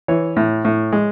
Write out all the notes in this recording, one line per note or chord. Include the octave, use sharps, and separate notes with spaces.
E3 C#5
A2
A2
G#3